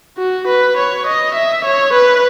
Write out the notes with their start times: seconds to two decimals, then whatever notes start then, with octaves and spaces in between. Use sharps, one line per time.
0.18 F#4
0.47 B4
0.77 C#5
1.06 D#5
1.34 E5
1.64 C#5
1.93 B4